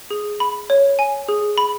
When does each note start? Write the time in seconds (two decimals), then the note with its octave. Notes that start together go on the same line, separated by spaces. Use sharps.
0.11 G#4
0.40 B5
0.70 C#5
0.99 G#5
1.28 G#4
1.58 B5